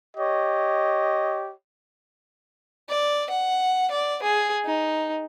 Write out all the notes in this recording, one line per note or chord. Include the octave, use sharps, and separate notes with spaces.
G4 C#5 D#5
D5
F#5
D5
G#4
D#4